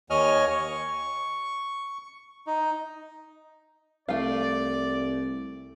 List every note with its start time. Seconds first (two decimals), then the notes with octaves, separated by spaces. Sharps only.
0.10 D#2 C#5 D#5 G#5 F6
0.50 C#6
2.47 D#4
4.09 C2 A3 D5 F5